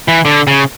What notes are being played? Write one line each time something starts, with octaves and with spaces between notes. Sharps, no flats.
E3
D3
C#3